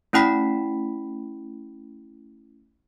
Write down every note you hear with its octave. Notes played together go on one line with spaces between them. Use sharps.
A3 C#4 E4 G5 B5 B6